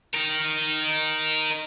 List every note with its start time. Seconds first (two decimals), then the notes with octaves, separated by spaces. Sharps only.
0.15 D#4 A#4